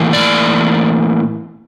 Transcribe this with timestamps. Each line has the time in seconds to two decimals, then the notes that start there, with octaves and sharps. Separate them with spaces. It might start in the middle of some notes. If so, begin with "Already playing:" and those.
Already playing: A2 E3 A#3
0.13 D5